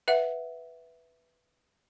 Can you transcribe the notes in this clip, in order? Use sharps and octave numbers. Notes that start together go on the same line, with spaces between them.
B4 E5 F#5